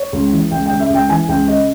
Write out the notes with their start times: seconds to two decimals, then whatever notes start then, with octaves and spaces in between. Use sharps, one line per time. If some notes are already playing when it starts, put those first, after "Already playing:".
Already playing: C#5
0.13 C#2
0.32 E3
0.51 C#2 G5
0.66 C#3 G5
0.80 E5
0.90 C#2 G5
1.09 E3 G#5
1.28 C#2 G5
1.48 C#3 D#5